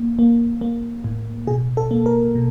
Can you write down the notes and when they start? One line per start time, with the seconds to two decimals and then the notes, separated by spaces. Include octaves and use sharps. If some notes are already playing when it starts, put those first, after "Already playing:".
Already playing: A#3
0.19 A#3
0.61 A#3
1.04 A2
1.47 B2 G#4
1.77 A4
1.91 A#3
2.06 A#4
2.35 B2